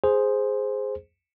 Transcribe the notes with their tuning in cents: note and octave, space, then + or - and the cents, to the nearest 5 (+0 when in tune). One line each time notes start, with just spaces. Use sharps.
G#4 +0 C5 +0